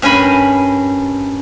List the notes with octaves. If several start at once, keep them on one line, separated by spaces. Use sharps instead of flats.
G2 C#4 A#4 G#5 B5